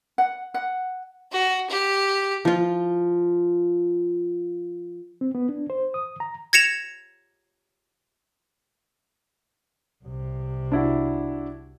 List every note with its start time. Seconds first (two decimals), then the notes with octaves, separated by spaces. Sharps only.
0.18 F#5
0.54 F#5
1.32 F#4
1.70 G4
2.45 F3 F4
5.21 C4
5.35 B3
5.49 D4
5.70 C5
5.94 D#6
6.20 A#5
6.53 G#6 A#6 C#7 E7 F7
10.04 C2 C3
10.72 D4 E4 F#4